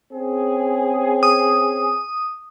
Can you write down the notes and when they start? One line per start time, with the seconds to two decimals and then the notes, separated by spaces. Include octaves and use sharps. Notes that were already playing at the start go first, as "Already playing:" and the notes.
0.13 C4 C#4 G#4
1.23 D#6